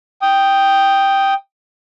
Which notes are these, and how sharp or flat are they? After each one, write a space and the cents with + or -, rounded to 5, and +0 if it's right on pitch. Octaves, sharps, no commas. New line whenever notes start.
G5 +0 D#6 +0